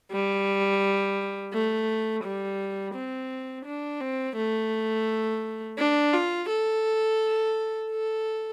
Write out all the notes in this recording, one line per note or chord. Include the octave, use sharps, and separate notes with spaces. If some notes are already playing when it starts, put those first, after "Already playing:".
G3
A3
G3
C4
D4
C4
A3
D4
F4
A4
A4